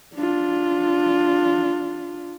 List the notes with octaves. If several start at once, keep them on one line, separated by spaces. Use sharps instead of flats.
D4 F4